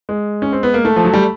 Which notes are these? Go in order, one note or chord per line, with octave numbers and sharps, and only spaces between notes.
G#3
C#4
C4
B3
A#3
A3
F3
F#3
G3